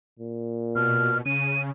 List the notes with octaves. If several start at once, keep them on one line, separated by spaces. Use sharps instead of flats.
A#2
B2 F6
C#3 D#7